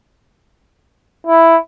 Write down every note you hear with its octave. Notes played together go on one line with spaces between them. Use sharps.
E4